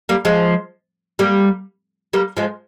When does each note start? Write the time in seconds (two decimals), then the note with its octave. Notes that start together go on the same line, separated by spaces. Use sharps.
0.09 G3 A#3
0.25 F3 G#3
1.19 G3 A#3
2.13 G3 A#3
2.37 F3 G#3